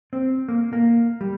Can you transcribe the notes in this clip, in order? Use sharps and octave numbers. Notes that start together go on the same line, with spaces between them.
C4
A#3
A#3
G3